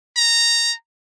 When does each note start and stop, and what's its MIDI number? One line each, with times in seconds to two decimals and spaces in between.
0.17 0.74 82